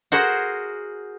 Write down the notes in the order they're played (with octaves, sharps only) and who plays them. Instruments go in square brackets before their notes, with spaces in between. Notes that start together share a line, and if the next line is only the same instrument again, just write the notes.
[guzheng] F#4 G#4 A#4 C5 F#5